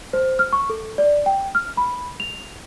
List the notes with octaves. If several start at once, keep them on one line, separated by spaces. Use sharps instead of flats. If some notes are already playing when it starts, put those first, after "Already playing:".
C5
F6
C#6
A4
D5
G5
F6
B5
F7